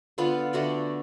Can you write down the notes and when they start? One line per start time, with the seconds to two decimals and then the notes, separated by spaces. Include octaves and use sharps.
0.18 D3 B3 F4
0.53 D3 A3 F#4 D5